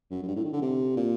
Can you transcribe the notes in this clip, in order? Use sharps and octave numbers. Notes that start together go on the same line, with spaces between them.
F#2
F#2
G2
A2
D#3
D3
C3
A#2